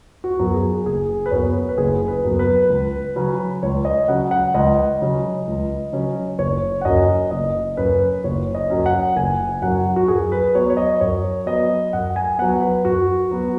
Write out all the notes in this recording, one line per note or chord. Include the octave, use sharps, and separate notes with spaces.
F#4
F#2 F#3 B3
G#4
F#1 G#4
B4
F#2 F#3 B3 C#5
B4
F#1 G#4
B4
F#2 F#3 B3
B4
C#2
C#3 F#3 C#4
C#2 C#5
D#5
C#3 F#3 C#4 F#5
F#5
C#2 D#5
C#3 F#3 C#4
C#2
C#3 F#3 C#4
F#1 C#5
F#5
F#2 F#3 C#4 D#5
F#1 D#5
F#2 F#3 C#4 B4
F#1 C#5
D#5
F#2 F#3 C#4
F#5
F#1 G#5
F#2 F#3 C#4 F#5
F#4
F#2 G#4
B4
F#3 B3 C#5
C#5
D#5
F#2 C#5
F#3 B3 D#5
F#2 F#5
G#5
F#3 B3 F#5
B4
F#2 F#4
F#3 B3